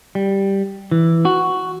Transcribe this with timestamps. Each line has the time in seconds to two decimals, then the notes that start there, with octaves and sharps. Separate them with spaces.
0.15 G3
0.91 E3
1.25 F#4